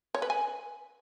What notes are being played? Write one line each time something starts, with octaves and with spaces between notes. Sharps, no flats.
C#5
B4
G#5